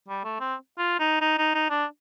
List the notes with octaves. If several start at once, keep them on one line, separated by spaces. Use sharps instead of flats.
G3
A3
C4
F4
D#4
D#4
D#4
D#4
D4